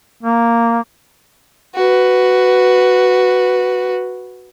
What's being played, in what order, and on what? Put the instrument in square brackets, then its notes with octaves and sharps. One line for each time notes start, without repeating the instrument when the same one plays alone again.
[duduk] A#3
[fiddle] F#4 B4